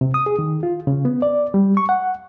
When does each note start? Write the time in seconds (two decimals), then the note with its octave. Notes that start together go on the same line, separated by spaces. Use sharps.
0.01 C3
0.14 D#6
0.26 G#4
0.39 D#3
0.63 F4
0.87 C#3
1.05 B3
1.22 D5
1.54 G3
1.77 C#6
1.89 F#5